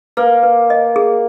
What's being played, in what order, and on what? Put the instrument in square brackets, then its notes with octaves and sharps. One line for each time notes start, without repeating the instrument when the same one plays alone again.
[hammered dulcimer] A#3 [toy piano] B4
[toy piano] B4
D#5
G#4